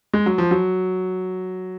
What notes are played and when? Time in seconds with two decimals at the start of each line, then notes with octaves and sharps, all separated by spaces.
0.14 G#3
0.26 F#3
0.38 F3
0.51 F#3